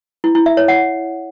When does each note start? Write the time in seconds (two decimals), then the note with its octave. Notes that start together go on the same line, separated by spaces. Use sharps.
0.24 E4
0.35 E4
0.46 E5
0.57 C#5
0.68 F#5